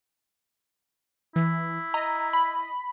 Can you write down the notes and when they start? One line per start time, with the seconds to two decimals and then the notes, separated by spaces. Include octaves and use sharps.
1.36 E3 E4
1.94 D#5 A#5
2.33 B5